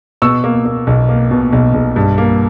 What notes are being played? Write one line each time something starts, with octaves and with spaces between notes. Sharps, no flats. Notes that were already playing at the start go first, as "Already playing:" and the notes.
B2 C#6 E6
A#3
A#3
B1
A#3
B2
B1
B1
G2
A#3